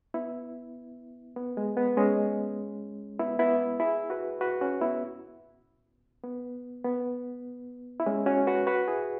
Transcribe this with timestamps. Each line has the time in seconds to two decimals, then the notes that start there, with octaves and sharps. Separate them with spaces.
0.14 B3 E4
1.36 B3
1.57 G#3
1.77 B3
1.97 G#3 C#4
3.19 B3 E4
3.39 B3 E4
3.80 E4 G#4
4.10 F#4 B4
4.41 F#4 B4
4.61 C#4 F#4
4.81 B3 E4
6.23 B3
6.85 B3
8.00 E4
8.06 G#3 C#4
8.26 C#4 F#4
8.47 F#4 B4
8.67 F#4 B4
8.88 E4 G#4